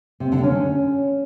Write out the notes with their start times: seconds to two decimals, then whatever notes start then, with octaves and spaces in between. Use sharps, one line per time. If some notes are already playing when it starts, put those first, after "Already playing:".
0.20 C3
0.32 D3
0.43 C#4